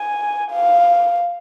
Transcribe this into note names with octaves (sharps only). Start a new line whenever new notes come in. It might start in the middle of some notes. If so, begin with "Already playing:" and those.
Already playing: G#5
F5